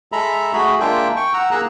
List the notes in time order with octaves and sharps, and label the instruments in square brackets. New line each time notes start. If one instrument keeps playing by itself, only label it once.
[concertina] G#3 A4 E5 A#5 B5
A3 F#4 G#4 B5
G#3 A#3 D4 F4 E5 G5
G5 C#6
F#5 A#5 E6
A#3 G#4 A#5 E6 F#6